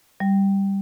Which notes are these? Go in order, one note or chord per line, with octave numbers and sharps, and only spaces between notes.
G3